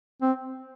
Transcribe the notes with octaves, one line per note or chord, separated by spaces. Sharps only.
C4